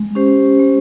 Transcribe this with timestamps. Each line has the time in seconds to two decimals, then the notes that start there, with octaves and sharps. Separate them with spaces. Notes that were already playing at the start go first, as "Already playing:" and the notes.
Already playing: G#3
0.15 C#4 G4 C5
0.59 G#3